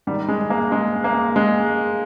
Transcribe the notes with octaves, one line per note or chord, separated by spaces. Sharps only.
G#2 D#3 G3
G#3
A#3
G#3
A#3
G#3